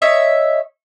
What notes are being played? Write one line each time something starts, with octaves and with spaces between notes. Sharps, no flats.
C#5 D#5 E5